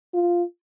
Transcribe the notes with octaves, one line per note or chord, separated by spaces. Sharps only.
F4